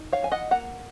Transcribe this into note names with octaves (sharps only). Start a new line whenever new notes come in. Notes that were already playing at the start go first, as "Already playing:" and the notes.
Already playing: D#4
C#5 F5
F3 G#5
D#5 F#5
A#3 F#5 A#5